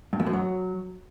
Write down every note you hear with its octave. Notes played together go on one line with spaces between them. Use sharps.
G2
E2
F#2
F#3